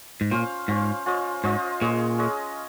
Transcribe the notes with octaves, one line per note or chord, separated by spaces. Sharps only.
G#2
A#2 C#4 F4 C5 F5
G#2 C#4 F4 C5 F5
C#4 F4 C5 D#5
G#2 C#4 F4 C5 D#5
A#2 G#3 C#4 G#4 D#5
G#3 C#4 G#4 D#5